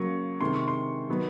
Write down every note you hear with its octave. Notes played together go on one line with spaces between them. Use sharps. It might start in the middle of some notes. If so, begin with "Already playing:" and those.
Already playing: C#3 F#3 A#3 C#6
C3 D#3 G#3 C6
C#6
C6
D#3 F#3 B3